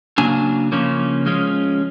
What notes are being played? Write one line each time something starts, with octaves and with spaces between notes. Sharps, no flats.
C#3 F#3 A#3 D4 G#5
C#3 F3 A#3 C#4
F3 G#3 C#4